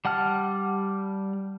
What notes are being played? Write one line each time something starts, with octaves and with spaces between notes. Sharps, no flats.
G3 F#5 A5 F6